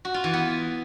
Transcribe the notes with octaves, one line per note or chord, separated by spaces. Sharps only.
F#4
F4
E3
B3